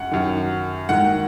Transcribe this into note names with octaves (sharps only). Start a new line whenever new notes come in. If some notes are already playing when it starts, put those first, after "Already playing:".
Already playing: F#2 F#5
F#2 D#3
G#2 D#3 F#5